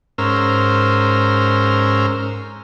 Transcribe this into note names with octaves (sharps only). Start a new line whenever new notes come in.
G#2 C#4 A#4 C5 E6 F6